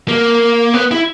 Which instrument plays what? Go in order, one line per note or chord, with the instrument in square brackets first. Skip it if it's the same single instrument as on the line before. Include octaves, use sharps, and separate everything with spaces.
[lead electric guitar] A#3
B3
E4